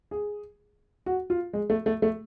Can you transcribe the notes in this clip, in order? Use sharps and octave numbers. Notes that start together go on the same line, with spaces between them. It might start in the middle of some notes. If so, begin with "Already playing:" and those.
G#4
F#4
F4
G#3
A3
A3
A3